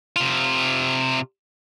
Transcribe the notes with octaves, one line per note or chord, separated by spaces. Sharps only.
C3 F4